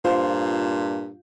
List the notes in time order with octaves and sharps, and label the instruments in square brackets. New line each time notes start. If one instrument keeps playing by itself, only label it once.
[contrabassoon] G2 [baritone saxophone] A#2 [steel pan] F4 [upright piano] C5